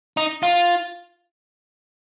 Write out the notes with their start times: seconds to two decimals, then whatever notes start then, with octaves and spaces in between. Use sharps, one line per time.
0.17 D#4
0.43 F4